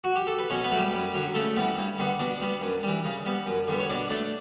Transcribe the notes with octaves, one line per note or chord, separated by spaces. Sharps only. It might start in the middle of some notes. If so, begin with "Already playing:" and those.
F#4
G4
A4
B4
B2 C#4 C#5
B3 B4
F#3 A3
G3 G4
F#2
D3 F#3
C#3 A3 A4
E3 G3 B3
G2
D3 G3 B3
B2 D4 D5
G3 B3
F#2
E3 G3
C#3
G3 B3
F#2
D3 G3 B3
C#5
B2 D4 D5
A3 D4 D5